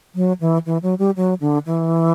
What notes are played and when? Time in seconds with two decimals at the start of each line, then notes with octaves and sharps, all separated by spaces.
0.15 F#3
0.41 E3
0.66 E3
0.83 F#3
0.99 G3
1.16 F#3
1.41 D3
1.66 E3